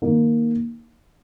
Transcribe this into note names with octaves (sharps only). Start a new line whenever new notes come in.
D#3 A#3 D#4